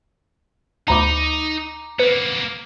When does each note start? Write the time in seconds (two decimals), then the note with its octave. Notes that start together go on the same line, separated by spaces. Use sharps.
0.88 D2 D#4 A#5 B5 D6
1.99 A#3 B3 B4